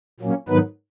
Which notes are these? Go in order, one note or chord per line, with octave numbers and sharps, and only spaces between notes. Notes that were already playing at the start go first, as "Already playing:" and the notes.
A#2 F#3 A#3 C#4
G#2 D#3 F#3 B3 D#4 B4